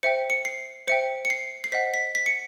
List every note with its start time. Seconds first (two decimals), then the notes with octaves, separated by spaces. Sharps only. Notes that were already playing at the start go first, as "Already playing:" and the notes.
0.03 C5 E5 G5 C#7
0.30 C#7
0.45 C7
0.87 C5 E5 G5 C#7
1.25 C#7
1.30 C7
1.64 C7
1.72 C5 D#5 F#5 B6
1.94 B6
2.15 B6
2.26 C#7